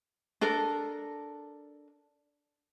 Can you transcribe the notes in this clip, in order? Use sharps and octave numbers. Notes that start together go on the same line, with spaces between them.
D4 A4 A#4